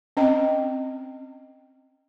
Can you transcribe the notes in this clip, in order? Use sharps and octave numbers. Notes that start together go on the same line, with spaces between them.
C4 C#4 D#5 G5